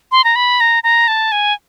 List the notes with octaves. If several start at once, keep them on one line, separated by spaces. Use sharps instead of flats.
C6
A#5
B5
A#5
A#5
A5
G#5